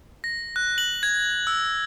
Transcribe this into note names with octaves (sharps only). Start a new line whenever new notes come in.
A#6
F#6
F#7
G#6
E6